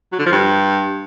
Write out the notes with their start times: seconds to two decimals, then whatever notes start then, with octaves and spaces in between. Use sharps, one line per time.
0.12 F#3
0.19 D3
0.26 F3
0.32 G2